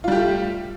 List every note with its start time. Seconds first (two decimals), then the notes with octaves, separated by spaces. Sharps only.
0.04 F4
0.08 G3
0.12 G4
0.16 A3